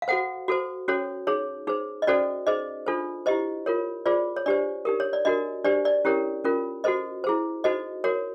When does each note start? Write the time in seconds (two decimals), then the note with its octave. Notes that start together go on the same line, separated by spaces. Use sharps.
0.02 F5
0.08 F#4 A4 C5 F#5
0.48 F#4 A4 C5
0.88 C#4 F#4 A4 C#5
1.27 D#4 G#4 C#5
1.67 D#4 G#4 C5
2.02 D#5
2.07 C#4 F#4 A4 C5 D5
2.47 D#4 G#4 C5 D#5
2.86 D4 F4 A4 C5
3.26 E4 G4 C5 D#5
3.66 F4 A#4 C#5
4.06 F4 G#4 C5 D5
4.36 C#5
4.46 D4 G4 C5 D5
4.85 D#4 G4 A#4
5.00 C#5
5.13 D5
5.25 D4 F#4 A#4 D#5
5.65 D4 G4 C5 D5
5.85 D5
6.05 C#4 E4 G4 A#4 C#5
6.44 C#4 F4 A#4
6.84 F#4 A4 C5 D#5
7.24 E4 G#4 C5
7.64 D#4 F#4 A4 C5 D#5
8.04 F#4 A#4 C#5